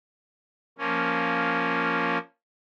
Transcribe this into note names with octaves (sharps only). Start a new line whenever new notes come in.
F3 A#3 C#4